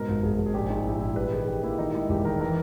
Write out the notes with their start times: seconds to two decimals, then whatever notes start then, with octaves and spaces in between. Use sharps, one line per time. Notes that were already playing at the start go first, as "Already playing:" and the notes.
Already playing: G#2 B2 A#4
0.08 G#1
0.23 G#1 G#4
0.38 G#1
0.46 G#4
0.54 A#1 G4
0.70 A#1 D#4
0.85 G#3 E4
1.01 A#1 E4
1.16 G3 B4
1.32 D#3 G#4
1.47 D#3 G4
1.63 A#3 E4
1.78 D#3 D#4
1.89 G4
1.94 G#3 E4
2.09 E1 G4
2.25 D#3 A#4
2.40 E3 A#4